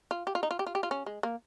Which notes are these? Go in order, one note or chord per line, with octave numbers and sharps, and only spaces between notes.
F4
G4
F4
D#4
F4
G4
F4
G4
F4
C#4
G#3
A#3